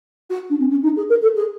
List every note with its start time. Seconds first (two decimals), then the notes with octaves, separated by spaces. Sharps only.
0.30 F#4
0.49 D4
0.59 C4
0.70 C#4
0.83 D#4
0.96 G#4
1.09 A#4
1.22 A4
1.35 G#4